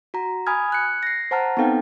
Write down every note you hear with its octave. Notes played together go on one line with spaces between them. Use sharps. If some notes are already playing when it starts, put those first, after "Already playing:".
F#4 A#5
G#5 B5 D#6 F6 G#6
F#6 C#7
A#6 C7
C5 F#5 A5 A#5 F6
B3 C4 D#4 A4 F5 G5